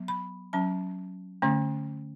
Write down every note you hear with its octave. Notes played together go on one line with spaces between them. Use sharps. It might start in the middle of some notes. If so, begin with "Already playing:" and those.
Already playing: F#3 B3
B5
F#3 C#4 A5
D3 A3 C#4